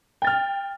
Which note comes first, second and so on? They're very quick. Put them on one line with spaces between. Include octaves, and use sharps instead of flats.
G5 A6 F6